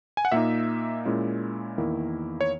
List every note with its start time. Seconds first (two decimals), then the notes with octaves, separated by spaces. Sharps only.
0.17 G#5
0.25 F#5
0.32 A#2 A#3 D#4 E5
1.05 A#2 G#3 C#4 E4
1.78 E2 D#3 A#3 E4
2.41 C#5